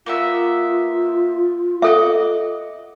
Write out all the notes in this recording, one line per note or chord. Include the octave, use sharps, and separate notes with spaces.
A#3 B3 F4 E5
A4 D#5 E5 F#5 D6